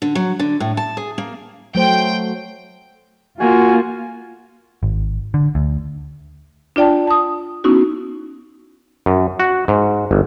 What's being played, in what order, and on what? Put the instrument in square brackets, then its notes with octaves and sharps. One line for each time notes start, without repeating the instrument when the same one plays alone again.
[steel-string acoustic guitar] D3
F#3
D3
A2
A5
G#4
A#3
[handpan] F#3 A3 C5 [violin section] G5
[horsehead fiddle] A#3 [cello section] F4 [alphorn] F#4 [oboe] G#5
[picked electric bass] G#1
D3
D2
[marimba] D4 F4 D5 G5 A5
A5 D#6
B3 C#4 D#4 E4 F#4
[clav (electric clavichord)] F#2
F#4
G#2
G1